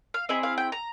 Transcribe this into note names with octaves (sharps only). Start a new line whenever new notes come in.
F5
C4 E4 G#4 D#5
F5
G5
A#5